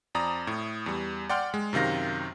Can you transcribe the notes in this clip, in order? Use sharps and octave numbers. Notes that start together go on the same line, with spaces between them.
F2 D5 A#5 D#6
A2
E2 G3
D5 F#5 G5 C6 F6
G#3
F#2 C3 D#3 F5 A#6